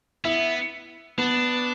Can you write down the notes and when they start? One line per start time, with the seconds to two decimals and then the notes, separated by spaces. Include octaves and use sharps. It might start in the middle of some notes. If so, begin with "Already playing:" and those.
0.25 B3 E4
1.18 B3 D4